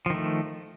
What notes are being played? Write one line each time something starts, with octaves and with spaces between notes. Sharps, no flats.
D#3 F3 A3